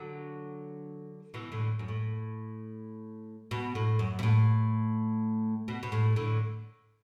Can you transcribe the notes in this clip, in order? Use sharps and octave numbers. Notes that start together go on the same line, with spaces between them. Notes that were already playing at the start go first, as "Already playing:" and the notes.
Already playing: D3 F#3
B2 E3
A2 D3
F#2
A2
B2
A2
F#2
B2
A2
B2
B2
A2
A2 D3